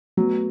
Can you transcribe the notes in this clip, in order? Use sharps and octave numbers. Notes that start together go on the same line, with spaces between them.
F#3 A3 B3